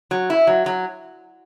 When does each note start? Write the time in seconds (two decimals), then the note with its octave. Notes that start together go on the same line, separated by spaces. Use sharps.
0.11 F#3
0.30 E4
0.47 F#3
0.66 F#3